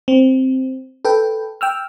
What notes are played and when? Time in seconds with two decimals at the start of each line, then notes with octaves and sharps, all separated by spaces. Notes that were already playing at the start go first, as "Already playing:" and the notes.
0.08 C4
1.05 A4 B4 G5
1.61 G5 E6 F6